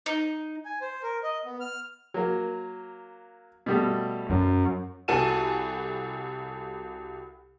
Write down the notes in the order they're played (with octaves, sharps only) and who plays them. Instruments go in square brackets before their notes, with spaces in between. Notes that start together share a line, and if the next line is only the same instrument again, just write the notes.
[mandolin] D#4
[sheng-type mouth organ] G#5
C5
A#4
D#5
B3
F6
[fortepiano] F#3 A#3
B2 G3 A3
[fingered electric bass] F#2
[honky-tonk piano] C2 F#4 A4 G#5 D#7 E7